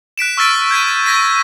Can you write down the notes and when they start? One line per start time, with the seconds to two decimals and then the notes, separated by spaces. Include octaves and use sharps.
0.18 F#6 B6 D7 E7
0.37 C#6 E6 F6 A6 B6 D7
0.71 G6 G#6 B6 D#7
1.06 C#6 G#6 A#6 B6 D#7